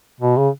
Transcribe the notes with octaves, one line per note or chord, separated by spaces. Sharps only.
B2
C#3